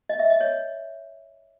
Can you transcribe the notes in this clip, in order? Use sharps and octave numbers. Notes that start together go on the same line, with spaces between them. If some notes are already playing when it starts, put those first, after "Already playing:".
D#5
E5
D#5
C#5